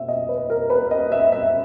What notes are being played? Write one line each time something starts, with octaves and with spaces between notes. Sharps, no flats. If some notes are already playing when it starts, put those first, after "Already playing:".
Already playing: B2 A#3 E5
D#5
B4
A#4
B4
D#5
E5
E5